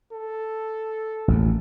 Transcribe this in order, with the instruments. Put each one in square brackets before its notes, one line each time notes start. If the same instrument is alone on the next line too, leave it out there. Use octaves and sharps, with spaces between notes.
[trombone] A4
[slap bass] A1 D#2